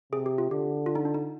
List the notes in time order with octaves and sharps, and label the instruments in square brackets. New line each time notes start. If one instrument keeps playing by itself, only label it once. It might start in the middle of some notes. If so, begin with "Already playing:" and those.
[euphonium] C3 [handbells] G#4
[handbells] G4
F4
[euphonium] D3 [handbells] G4
[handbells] F4
D#4
D4
D#4